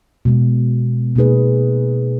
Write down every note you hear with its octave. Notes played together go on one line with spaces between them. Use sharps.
B2 G#3 B3
B2 A#3 D#4 G#4 B4